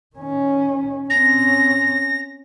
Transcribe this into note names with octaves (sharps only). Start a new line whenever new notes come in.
D#3 C#4
C4 C#4 A#6